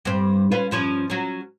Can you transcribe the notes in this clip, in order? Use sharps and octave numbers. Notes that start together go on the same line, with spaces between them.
G2 C4
C#4 F4 B4
G2 F3 C#4
F#3 C#4